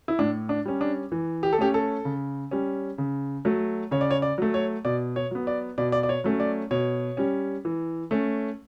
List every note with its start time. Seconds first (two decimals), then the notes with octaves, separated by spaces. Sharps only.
0.08 E4
0.19 A2 D4
0.49 D4
0.65 G3 C#4
0.81 D4
1.12 E3
1.43 G4
1.53 A4
1.58 A3 C#4 G4
1.74 A4
2.05 C#3
2.51 G3 C#4
2.98 C#3
3.45 F#3 A3
3.91 C#3 C#5
4.01 D5
4.11 C#5
4.22 D5
4.38 F#3 A3
4.54 C#5
4.85 B2 D5
5.16 C#5
5.31 F#3 B3
5.47 D5
5.78 B2 D5
5.92 D5
6.03 D5
6.09 C#5
6.24 F#3 A3 C#4
6.40 D5
6.71 B2 C#5
7.17 G3 C#4
7.65 E3
8.11 A3 C#4